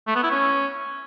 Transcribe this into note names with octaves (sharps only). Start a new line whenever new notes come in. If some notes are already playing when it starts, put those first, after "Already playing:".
A3
B3
E4
C#4